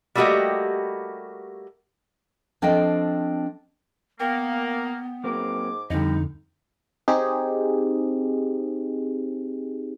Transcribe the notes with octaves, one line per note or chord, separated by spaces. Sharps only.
G3 A3 A#3 F#4 G4 D#5
F3 C4 D4 A4 D#5 G5
A#3 B3 G5
G#2 F#3 A#3 C4 D6
F2 D3 G3 D#4 G4 D#5
C4 D#4 G4 G#4